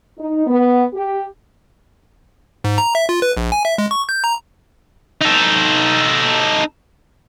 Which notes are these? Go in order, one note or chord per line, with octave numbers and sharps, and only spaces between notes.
D#4
B3
G4
G#2
A#5
E5
F4
B4
A#1
G#5
E5
G#3
C#6
G6
A#5
D#4 A4